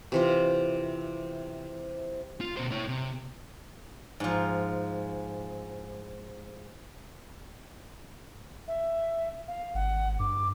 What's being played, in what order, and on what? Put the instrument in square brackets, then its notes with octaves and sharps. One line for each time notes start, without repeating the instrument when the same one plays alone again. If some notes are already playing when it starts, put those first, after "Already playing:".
[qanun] C3 E3 F4
[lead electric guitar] F4
B2 C5
E4 C#5
C3
[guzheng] G#2 F3
[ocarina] E5
F5
[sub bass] G#1 [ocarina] F#5
[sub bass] G2 [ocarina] D6